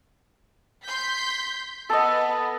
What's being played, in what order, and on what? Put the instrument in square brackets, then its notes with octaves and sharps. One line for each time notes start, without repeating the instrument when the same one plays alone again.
[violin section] C6 G6 B6
[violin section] B3 [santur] A4 D#5